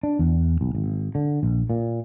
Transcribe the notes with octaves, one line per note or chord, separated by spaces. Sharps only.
D4
E2
B1
G#1
D3
A#1
A#2